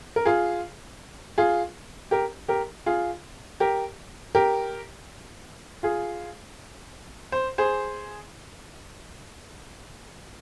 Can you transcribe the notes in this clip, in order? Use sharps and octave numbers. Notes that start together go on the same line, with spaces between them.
A#4
F4 G#4
F4 G#4
G4 A#4
G4 A#4
F4 G#4
G4 A#4
G4 A#4
F4 G#4
C5
G#4 C5